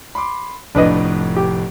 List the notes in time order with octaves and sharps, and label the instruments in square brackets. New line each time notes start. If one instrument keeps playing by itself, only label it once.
[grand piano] B5 C6 D6
[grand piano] F1 F2 A2 [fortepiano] D4 B4 D#5
[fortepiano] G4